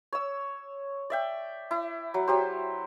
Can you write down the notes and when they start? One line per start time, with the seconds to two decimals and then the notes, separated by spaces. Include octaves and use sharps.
0.13 C#5 E6
1.10 D5 E5 G5
1.71 E4
2.14 F#3
2.27 F#3 G4 C5